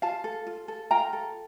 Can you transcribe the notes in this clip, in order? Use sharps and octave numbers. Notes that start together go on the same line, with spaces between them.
F4 F5 A5
A4
F4
A4
F4 G5 A#5
A4